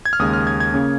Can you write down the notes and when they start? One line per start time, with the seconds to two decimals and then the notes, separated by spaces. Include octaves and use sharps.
0.05 G#6
0.13 F6
0.19 D#2 C#3 G#3 D#6
0.33 F6
0.47 G#6
0.60 G#6
0.74 C#3 A#3 C#4